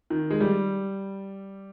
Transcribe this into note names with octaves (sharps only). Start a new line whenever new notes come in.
D#3
G#3
G3